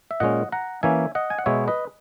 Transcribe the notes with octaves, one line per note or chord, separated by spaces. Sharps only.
E5
A#2 G#3 C#4 D#5 F#5
F#5 A#5
E3 A#3 C#4 E5 G#5
D#5 F#5
G#5
F#5
B2 G#3 B3 C#5 E5
B4 D#5